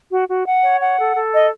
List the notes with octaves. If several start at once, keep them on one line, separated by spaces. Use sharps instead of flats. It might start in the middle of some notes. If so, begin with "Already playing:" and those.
F#4
F#4
F#5
C#5
F#5
A4
A4
D#5